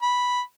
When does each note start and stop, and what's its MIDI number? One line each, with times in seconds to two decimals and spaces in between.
0.02 0.41 83